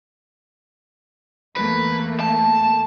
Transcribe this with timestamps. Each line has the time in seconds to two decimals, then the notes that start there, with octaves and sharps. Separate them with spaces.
1.56 E2 A3 A#3 B4
2.20 A5